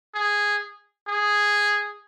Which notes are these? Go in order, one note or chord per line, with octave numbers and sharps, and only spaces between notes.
G#4
G#4